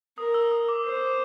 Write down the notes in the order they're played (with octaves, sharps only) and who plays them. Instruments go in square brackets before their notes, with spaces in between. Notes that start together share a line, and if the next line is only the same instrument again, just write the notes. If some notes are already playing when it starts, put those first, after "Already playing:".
[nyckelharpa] A#4 [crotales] D#6
[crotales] E6
D#6
D6
[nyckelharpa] C5